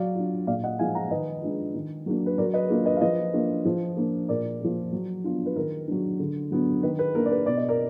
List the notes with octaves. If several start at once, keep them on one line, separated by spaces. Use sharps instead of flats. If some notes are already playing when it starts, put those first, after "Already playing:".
Already playing: F#3 D5 F5
D4 F4
A#2 D5 F5
D#5 F#5
F3 G#3 D#4 F5 G#5
F#5 A#5
D#3 B4 D#5
G#3 D4 F4
D#3
F#3 A#3 D4
B4
F#3 A#4 D5
B4 D#5
A#3 D4 F4
B4 D#5
F5
F3 B4 D#5
A#3 D4 F4
F3
A#3 D4
A#2 A#4 D5
F3 A#3
F#3
B3 D4 F4
B4
D#3 A#4
F#3 D4
D3
F#3 B3 D4
D#3 B4
B4
A#3 D4 A#4
D5
B4
B2 D5
D#5
A#4 D5